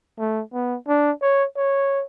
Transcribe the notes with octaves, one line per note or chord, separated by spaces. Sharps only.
A3
B3
D4
C#5
C#5